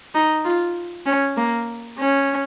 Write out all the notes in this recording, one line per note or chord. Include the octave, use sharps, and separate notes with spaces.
D#4
F4
C#4
A#3
C#4